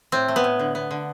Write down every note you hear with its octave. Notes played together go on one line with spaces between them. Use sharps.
A2 C4
A3
B3
A2
D3
B3
D3